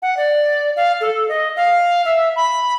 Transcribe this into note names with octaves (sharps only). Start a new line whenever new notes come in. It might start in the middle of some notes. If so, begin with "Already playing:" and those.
F#5
D5
F5
A4
D#5
F5
E5
B5